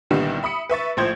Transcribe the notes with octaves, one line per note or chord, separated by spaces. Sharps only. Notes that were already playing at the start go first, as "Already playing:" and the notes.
C2 A#2 D3 D#3 G3 B3
E5 B5 D#6 C#7
B4 E5 C#6 A6
A#1 A2 F3 C5 G6 G#6